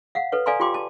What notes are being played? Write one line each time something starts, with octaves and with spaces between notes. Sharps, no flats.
F5 F#5
A4 B4 C#5
A4 D5 F5 G#5 A#5 C6
F4 G4 G5 C6 D6
A5